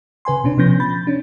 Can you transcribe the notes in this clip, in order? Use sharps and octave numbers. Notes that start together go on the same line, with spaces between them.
C#3 B4 G#5 C6
B2 C#4 D4
C3 F3 B3 C#4 G6 A#6
B5 G6 A6
C#4 D4